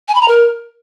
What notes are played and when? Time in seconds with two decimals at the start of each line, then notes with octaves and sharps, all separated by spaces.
0.08 G#5
0.15 B5
0.22 A#5
0.28 A#4